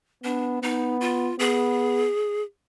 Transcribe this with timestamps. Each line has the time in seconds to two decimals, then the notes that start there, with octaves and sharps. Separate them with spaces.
0.24 B3 D4
0.62 B3 D#4
1.01 F4
1.39 B3 G#4